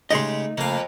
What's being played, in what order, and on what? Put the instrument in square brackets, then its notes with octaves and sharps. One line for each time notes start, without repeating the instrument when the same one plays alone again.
[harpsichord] C#3 G#3 G4 [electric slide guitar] A3 D#4 [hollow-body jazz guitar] D#5 C6
[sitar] F2 [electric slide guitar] C#3 A3 [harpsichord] A#3 F5